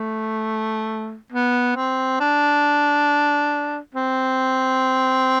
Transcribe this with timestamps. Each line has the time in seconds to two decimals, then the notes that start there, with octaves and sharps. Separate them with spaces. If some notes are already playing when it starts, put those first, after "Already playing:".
Already playing: A3
1.32 B3
1.76 C4
2.20 D4
3.95 C4